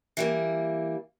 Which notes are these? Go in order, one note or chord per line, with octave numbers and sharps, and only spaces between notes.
E3 G3 A#3